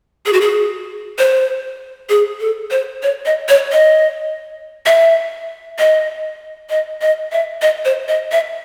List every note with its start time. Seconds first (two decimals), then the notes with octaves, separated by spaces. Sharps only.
0.26 G#4
0.33 F#4
0.41 G#4
1.19 C5
2.10 G#4
2.40 A4
2.71 C5
3.03 C#5
3.26 D#5
3.49 C#5
3.72 D#5
4.86 E5
5.79 D#5
6.70 D#5
7.02 D#5
7.32 E5
7.62 D#5
7.85 C5
8.08 D#5
8.32 E5